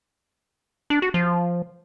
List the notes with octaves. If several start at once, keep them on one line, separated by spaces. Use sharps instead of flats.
D4
F#4
F3